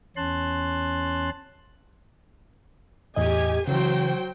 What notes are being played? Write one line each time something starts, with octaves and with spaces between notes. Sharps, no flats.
E2 C#4 A5 C6 F#6
E2 A2 G4 D#5 G#5
C#3 E3 F#3 C5 G5